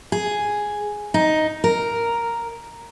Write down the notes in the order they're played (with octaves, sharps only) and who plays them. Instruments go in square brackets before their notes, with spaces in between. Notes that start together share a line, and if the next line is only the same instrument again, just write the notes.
[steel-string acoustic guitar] G#4
D#4
A#4